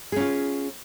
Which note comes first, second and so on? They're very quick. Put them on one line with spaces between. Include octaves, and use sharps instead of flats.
G#4 C#4 F4